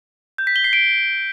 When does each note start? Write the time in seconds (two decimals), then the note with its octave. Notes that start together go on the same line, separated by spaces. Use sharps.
0.38 G6
0.47 B6
0.56 G7
0.64 C7
0.73 D7